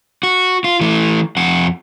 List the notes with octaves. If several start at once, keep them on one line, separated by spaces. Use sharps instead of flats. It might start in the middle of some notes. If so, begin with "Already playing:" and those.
F#4
F4
E3 A3
F2 F#5